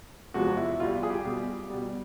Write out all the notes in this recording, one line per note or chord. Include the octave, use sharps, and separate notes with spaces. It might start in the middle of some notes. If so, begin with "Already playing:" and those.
E2 C3 F3 G#3 F#4
E4
B2 G3 F4
G#4
G4
B2 G3
B2 G3